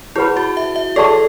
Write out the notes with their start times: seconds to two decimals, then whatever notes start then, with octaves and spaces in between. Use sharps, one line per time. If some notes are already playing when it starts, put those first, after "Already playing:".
0.16 E4 G#4 B4 F#5 B5
0.37 F#4
0.57 E5
0.76 E5
0.96 G#4 A4 D5 A5 C#6